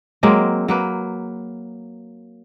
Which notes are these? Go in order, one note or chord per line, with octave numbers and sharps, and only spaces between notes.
F#3 G#3 A#3 C4
F#3 A#3 B4